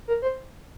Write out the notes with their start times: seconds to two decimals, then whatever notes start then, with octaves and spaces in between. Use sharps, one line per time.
0.08 A#4
0.22 C5